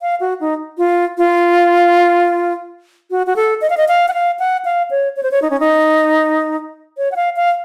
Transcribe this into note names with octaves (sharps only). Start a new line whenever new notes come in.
F5
F#4
D#4
F4
F4
F#4
F#4
A4
D#5
F5
D#5
F5
F#5
F5
F#5
F5
C#5
C#5
C5
C#5
D#4
C#4
D#4
C#5
F#5
F5
F5